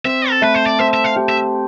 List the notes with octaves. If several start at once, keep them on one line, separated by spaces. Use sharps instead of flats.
C4 E5
A4
A3 B4
C5
D5
C4 E5
E5
F5
G4
E5